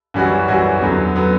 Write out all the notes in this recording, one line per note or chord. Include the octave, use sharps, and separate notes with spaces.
F#2 E3 G3 C#4 F#4
F#2 E3 G3 C#4 F#4
E2 D3 F#3 B3
D3 F#3 B3